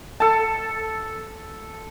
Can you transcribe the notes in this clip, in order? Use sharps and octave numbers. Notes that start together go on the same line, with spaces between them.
A4 A5